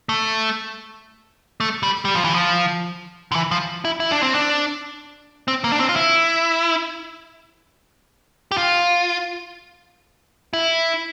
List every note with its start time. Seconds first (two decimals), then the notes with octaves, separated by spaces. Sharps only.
0.09 A3
1.60 A3
1.83 G3
2.05 G3
2.15 F3
2.24 E3
2.35 F3
3.32 D3
3.35 E3
3.51 F3
3.85 E4
4.00 E4
4.12 D4
4.23 C4
4.35 D4
5.48 C4
5.64 A#3
5.72 D4
5.80 C4
5.89 F4
5.96 E4
8.51 G4
8.57 F4
10.53 E4